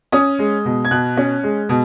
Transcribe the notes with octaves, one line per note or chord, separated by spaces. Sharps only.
C#4 D#6
G#3
B2
G#6
B2 F#6
C#4
G#3
B2